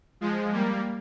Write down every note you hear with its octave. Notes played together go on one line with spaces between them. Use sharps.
F3 G#3
G3 A#3